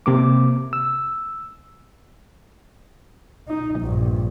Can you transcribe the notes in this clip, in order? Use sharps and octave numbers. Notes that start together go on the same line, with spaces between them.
C3 A#3 D6
E6
D#4
A#1 G2